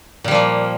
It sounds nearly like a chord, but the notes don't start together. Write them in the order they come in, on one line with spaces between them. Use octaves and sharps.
A#2 G3 F3 A#3